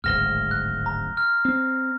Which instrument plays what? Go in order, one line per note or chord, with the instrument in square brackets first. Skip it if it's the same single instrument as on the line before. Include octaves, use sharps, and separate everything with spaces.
[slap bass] D1 G#1 G#2 [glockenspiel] F6 A#6 G7
[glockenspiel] F#6
A#5
F6
[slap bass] C4